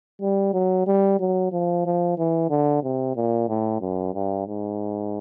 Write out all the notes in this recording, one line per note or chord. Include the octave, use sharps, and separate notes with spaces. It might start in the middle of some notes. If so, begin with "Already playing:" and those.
G3
F#3
G3
F#3
F3
F3
E3
D3
C3
A#2
A2
F#2
G2
G#2